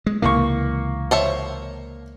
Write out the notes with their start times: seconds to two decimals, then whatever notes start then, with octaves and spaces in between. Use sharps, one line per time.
0.06 G#3
0.22 C#2 C3 E3 A#3 C#6
1.11 C5 C#5 E5